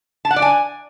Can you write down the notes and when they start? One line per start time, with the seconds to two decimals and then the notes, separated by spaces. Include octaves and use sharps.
0.25 A5
0.31 F#5
0.36 D5
0.42 G#5